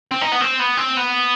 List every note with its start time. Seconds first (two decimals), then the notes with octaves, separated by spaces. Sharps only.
0.11 C4
0.21 D#4
0.32 B3
0.41 C4
0.59 B3
0.77 C4
0.97 B3